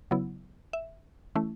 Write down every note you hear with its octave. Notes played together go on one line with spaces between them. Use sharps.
C#3 F#3 B3 E4
E5
E3 A3 C#4 E4